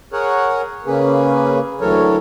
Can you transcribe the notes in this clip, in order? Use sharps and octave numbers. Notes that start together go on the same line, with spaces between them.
G#4 A#4 C#5 F#5
C#3 A#3 C#4 G#4 B4
D2 E3 F#3 A4 A#4 C#5